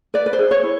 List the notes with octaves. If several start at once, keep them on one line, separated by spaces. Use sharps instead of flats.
B4 D5
B4
C5
G#4
C#5
E4